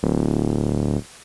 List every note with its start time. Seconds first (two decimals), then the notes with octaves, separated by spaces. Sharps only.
0.03 D1